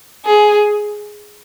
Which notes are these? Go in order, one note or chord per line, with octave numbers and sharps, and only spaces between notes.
G#4